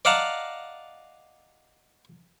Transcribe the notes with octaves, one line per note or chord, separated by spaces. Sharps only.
D5 D#5 F5 F#5 A5 A#5